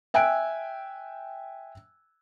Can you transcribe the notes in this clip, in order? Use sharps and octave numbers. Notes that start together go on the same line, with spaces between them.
E5 G5 G#5 E6 F#6 D7